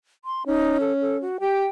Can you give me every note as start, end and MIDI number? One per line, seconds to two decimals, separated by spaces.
0.25 0.43 84
0.47 1.26 61
0.47 0.77 63
0.81 0.93 69
1.01 1.20 69
1.22 1.37 66
1.41 1.67 67
1.41 1.68 79